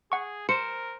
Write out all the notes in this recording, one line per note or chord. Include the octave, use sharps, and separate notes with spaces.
G#4 F#5 C#6
A#4 C5 C#7 E7